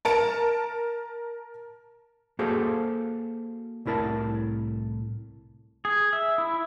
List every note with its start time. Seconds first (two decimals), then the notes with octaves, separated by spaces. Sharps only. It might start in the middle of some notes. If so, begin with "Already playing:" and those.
0.05 A#4 A5 D7
2.39 A#3 F#4 G#4 A4 C5 F5
3.85 C2 A2 E4 A#4 A5
5.85 G#4
6.13 E5
6.38 E4